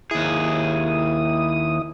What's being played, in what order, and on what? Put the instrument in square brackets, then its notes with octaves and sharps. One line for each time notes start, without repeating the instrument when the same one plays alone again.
[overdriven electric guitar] D#2 G#4 [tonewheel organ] E4 D#6